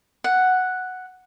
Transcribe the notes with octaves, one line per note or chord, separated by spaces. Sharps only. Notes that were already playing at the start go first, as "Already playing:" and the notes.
F#5